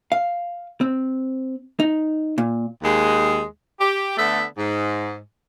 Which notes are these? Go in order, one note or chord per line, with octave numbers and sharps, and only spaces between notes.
F5
C4
D#4
A#2
D#2 G#3
G4
D3 A3 B3 E5
G#2